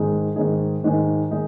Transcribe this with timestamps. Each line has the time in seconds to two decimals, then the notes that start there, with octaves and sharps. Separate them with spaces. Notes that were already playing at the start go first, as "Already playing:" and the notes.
Already playing: G#2 D#3 G#3 D#4 G#4
0.36 G#2 D#3 G#3 D#4 G#4
0.84 G#2 D#3 G#3 D#4 G#4
1.31 D#3 G#3 D#4 G#4